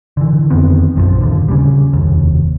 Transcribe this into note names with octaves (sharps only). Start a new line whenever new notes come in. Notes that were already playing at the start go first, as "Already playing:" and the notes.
D3 E3
F2 D#3 B3 C4
A#1 F#2 D#3 F3
D#1 D#2 D3
C#3 G3
F1 D#2